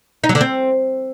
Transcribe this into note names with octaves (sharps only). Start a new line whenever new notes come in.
D#4
F#3
D3
C4